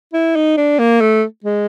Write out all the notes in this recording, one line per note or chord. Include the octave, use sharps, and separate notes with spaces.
E4
D#4
D4
A#3
A3
G#3